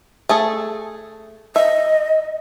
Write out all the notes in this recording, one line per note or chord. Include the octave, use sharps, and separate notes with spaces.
A3 G#4 A4
D#5 E5